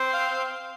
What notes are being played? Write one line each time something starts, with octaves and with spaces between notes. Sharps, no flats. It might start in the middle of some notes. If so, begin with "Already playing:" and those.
Already playing: C4 C5
F5